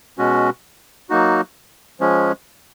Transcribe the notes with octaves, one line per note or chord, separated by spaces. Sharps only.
B2 G#3 C#4 F#4
F#3 A#3 D#4 F#4
F3 G#3 C#4